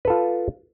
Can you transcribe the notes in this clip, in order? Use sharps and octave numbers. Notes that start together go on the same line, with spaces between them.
F4 A4 B4